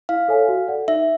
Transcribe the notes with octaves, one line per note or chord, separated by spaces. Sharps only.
E4 F5
A4 C#5 E5 G#5
F#4
A4 D5 F#5
D#4 E5